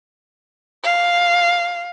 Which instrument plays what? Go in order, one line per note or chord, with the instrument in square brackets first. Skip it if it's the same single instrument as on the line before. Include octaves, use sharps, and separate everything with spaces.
[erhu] F5